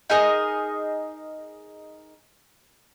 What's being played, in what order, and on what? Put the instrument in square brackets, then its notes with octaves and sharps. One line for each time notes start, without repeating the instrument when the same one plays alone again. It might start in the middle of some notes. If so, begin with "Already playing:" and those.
[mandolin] D#4 G#4 A#4 D#5